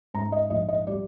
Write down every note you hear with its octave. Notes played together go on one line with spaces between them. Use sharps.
G#2 A#5
D#5
A#1 D#5
D#5
G3 D5